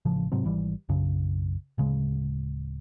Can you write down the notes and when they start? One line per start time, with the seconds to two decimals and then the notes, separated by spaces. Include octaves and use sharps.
0.05 A1 C#3 F3
0.32 G#2 C3 F#3 C4
0.44 G#1 E3 G3
0.89 B1 F#2 C#3
1.78 D1 C#3 G#3